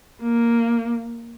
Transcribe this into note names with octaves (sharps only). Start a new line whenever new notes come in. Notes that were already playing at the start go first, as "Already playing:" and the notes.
A#3